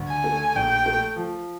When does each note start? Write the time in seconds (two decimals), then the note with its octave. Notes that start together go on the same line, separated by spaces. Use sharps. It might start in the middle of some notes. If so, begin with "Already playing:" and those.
Already playing: D2
0.09 G#5
0.24 A3
0.55 A#1 G5
0.86 A3
1.16 F3